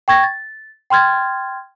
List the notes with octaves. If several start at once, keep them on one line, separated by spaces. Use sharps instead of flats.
G5 C#6 G#6 A#6
A6
G5 C6 F6 G#6 A6